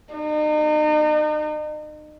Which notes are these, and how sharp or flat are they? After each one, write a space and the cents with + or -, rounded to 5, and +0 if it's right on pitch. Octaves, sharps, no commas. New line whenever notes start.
D#4 -40